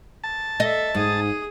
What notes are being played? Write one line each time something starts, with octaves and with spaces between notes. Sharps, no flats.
A5
A4 D#5 E5
G#2 D#4 G#4 D#6